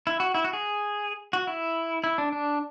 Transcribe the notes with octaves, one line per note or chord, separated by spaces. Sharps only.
E4
F#4
E4
F#4
G#4
F#4
E4
E4
D4
D4